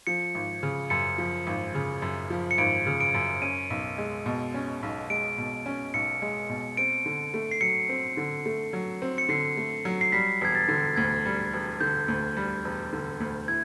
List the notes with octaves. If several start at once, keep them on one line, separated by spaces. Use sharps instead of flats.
F3 C#7
G#1
C#3
F#2 C#7
F3
G#1
C#3
F#2
F3
C#7
G#1 D7
C#3
D7
F#2
C#4 D#7
B1
G#3
B2
C#4
B1
G#3 D7
B2
C#4
B1 C#7
G#3
B2
C4 D7
D3
A3
C7
F#3 C#7
C4
D3
A3
F#3
C4
C#7
D3 C7
A3
F#3
C7
G3 B6
E1 G#6
A6
D3
D2 G#6
G3
E1
D3 G6
D2
G3
E1
D3
D2
E4 G#6